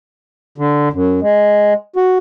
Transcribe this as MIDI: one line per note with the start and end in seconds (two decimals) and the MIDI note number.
0.58 0.89 50
0.93 1.20 42
1.22 1.73 56
1.96 2.18 66